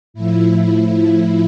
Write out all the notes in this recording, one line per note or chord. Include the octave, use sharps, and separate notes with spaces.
A2 F3 E4